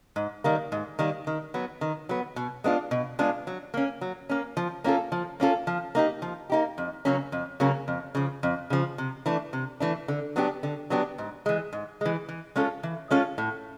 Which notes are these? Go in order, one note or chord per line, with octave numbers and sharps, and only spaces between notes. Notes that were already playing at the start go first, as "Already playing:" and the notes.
G#2
D#3 G3 A#3
G#2
D#3 G3 A#3
D#3
F#3 B3
D#3
F#3 B3
B2
G#3 B3 D4 F4
B2
G#3 B3 D4 F4
F#3
A#3 C#4
F#3
A#3 C#4
F3
A#3 C#4 F4 A4
F3
A#3 C#4 F4 A4
F3
A#3 D#4 G4
F3
A#3 D#4 G4
F2
C#3 F#3 A#3 C#4
F2
C#3 F#3 A#3 C#4
F2
C#3 F3
F2
C#3 F3
C3
E3 A3 D4
C3
E3 A3 D4
D3
F#3 B3 D4 G4
D3
F#3 B3 D4 G4
G#2
E3 G#3
G#2
E3 G#3
E3
G#3 C#4 F4 A4
E3
G#3 C#4 F4 A4
A2